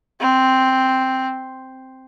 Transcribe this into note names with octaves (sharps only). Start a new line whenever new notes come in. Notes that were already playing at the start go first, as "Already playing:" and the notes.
C4